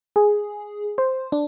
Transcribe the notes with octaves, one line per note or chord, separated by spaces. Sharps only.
G#4
C5
D4